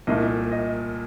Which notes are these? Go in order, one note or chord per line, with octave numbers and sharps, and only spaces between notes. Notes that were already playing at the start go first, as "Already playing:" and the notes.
C2 A#2 A3 D#5
D#5